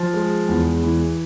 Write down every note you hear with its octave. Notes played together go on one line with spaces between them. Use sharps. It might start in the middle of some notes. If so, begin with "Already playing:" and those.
Already playing: F3
G#3
E2
E3